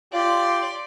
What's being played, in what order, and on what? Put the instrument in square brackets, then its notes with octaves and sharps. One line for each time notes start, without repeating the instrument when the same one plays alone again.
[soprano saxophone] F4 [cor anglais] G4 [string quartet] D5 C6